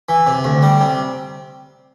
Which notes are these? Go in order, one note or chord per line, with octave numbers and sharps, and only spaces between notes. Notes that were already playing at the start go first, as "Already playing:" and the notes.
E3
C3
D2
G3
C3